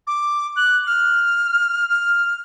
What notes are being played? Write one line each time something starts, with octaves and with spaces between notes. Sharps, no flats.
D6
F#6
F6
F6